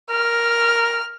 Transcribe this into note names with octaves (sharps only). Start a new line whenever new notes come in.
A#4 F6